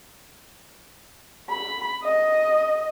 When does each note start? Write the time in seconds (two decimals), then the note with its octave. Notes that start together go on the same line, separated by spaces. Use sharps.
1.50 B5
2.03 D#5